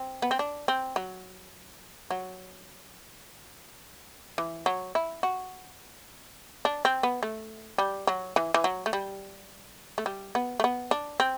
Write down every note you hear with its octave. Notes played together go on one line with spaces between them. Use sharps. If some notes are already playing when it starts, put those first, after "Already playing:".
Already playing: C4
B3
C4
D4
C4
F#3
F#3
E3
F#3
E4
F#4
D4
C4
B3
A3
G3
F#3
E3
E3
F#3
A3
G3
A3
G3
B3
A3
B3
D4
C4